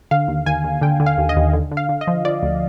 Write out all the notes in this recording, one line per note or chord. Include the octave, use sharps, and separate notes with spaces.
D3 F5
D#2
D#2 G#5
D#2
D3 G5
D3
F5
D#2
D#5
D#2
D3
D3
F5
D3
D#5
F3
F3 D5
D2